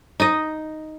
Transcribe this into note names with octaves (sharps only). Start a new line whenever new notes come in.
D#4 D#5